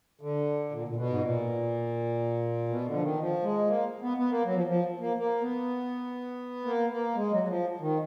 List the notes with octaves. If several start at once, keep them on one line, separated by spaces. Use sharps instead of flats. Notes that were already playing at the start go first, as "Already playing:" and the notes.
D3
A#2
A#2
B2
G#2
A#2
B2
D3
F3
D#3
F3
G#3
A#3
B3
B3
A#3
F#3
F3
F3
A#3
A#3
B3
A#3
A#3
G#3
F#3
F#3
F3
D#3